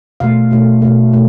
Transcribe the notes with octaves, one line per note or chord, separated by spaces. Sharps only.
B2 A3 F5
B2 A3
B2 A3
B2 A3